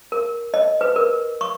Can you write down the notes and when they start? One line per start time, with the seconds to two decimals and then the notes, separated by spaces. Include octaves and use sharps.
0.12 A#4
0.54 D#5
0.81 B4
0.96 A#4
1.41 C#6